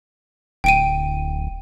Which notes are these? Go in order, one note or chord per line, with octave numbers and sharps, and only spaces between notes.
D1 G5 D7 D#7